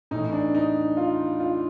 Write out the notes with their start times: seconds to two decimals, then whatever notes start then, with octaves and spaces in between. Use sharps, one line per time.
0.11 A2 E3 D#4
0.33 D4
0.55 D#4
0.97 F4
1.40 F4